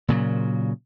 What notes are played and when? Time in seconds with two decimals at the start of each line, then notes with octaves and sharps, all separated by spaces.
0.08 A#2 C#3 F#3